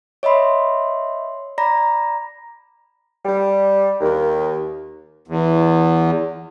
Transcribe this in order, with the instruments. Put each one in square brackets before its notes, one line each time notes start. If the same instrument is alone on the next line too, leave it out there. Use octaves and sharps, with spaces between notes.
[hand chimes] C#5 D#5 E5 B5 C6
D5 A#5 B5 A#6
[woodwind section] G3
D#2
[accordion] E2